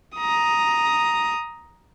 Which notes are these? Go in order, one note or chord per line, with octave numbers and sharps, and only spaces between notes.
A#5 D#6